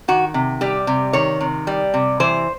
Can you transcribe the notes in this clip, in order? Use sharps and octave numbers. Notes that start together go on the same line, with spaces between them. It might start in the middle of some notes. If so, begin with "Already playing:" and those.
D#3 F#4
C3
G3 G4
C3
D#3 C#5
C3
G3
C3
E3 C5